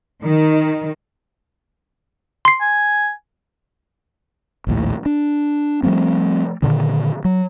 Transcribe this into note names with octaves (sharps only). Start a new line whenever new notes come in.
D#3
C6 C7
G#5
A#1 D#2 A2
D4
F3 G3 A3 C4
A#2 D3 D#3
F#3